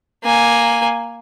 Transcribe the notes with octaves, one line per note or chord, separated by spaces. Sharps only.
A#3 G#5